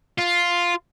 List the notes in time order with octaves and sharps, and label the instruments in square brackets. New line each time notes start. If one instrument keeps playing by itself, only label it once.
[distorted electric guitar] F4